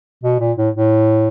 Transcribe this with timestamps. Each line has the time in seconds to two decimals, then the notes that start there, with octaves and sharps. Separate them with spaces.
0.24 B2
0.40 A#2
0.58 A2
0.75 A2